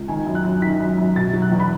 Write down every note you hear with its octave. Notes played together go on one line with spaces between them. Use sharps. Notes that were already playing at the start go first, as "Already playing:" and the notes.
Already playing: C#2
D#3 G#5
F#2
F#6
F#2
D#3 B6
F#2
F#2
B2 A6
F#3
F#6
E2
B5